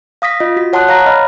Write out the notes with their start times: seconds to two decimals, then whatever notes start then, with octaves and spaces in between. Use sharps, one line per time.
0.22 F5 D#6 A#6 B6
0.40 F4 D#5
0.56 F#4 B6
0.73 C#5 F#5 A5 C6 D#6 F#6
0.88 C#5 F5 A#5 A#6
1.06 D#5 B5 F6